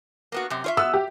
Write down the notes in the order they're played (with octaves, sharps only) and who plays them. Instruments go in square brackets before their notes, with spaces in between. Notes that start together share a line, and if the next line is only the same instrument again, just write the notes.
[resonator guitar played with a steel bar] A#3 B3 F#4
F#2 C3
F4 C#5 E5
[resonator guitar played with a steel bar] B3 [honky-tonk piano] E6
[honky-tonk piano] G4